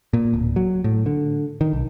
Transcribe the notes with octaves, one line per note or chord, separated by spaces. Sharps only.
A#2
D1
F#3
A2
D3
D#3
B1